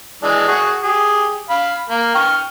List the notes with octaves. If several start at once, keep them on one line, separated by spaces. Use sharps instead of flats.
E3 G#3 D4
F#4 G#4 C#6
G4 G#4
F5 B5
A#3
G5 C#6 F6